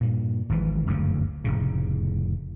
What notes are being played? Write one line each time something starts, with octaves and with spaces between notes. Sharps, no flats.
G2 A#2
G#1 G#2 E3 F3
F#1 D2 G2 C#3
F1 A2 C#3